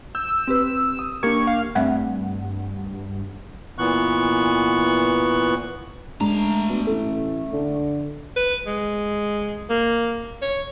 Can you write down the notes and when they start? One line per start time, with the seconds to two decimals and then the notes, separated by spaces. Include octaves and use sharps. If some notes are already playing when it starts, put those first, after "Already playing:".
0.15 E6 G6
0.47 C4 G4 B4
0.99 D#6
1.23 A#3 D4 G4 A#4 C#6 G#6
1.47 F5
1.75 G2 A3 C4 E5 F#5
3.78 A#2 E3 B3 C#6 F#6
6.21 F#2 G#3 A3 D4 A#5
6.70 B2 D4
6.87 A1 A4
7.53 D3
8.36 B4
8.67 G#3
9.70 A#3
10.42 C#5